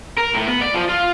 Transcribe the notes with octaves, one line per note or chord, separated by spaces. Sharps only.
A#4
A2
B3
D5
F3
F4